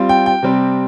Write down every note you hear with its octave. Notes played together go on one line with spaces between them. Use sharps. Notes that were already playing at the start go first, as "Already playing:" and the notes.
Already playing: G3 C4 F4
G5
G5
C3 G3 C4